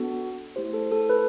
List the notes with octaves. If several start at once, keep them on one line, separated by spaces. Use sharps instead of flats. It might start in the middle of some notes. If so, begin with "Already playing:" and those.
Already playing: B3 D4 F#4 A4
A3 E4 G4 C5
A4
A4
B4